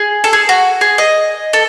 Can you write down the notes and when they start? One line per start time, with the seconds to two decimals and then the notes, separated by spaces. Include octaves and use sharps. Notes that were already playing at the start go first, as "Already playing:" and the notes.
Already playing: G#4
0.24 A4
0.33 G#4
0.49 F#4
0.81 G#4
0.98 D#5
1.53 A4